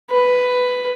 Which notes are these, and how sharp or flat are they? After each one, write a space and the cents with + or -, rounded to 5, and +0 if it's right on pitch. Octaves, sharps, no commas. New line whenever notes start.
B4 +10